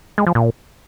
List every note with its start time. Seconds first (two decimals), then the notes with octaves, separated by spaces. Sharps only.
0.18 G#3
0.27 F3
0.35 A#2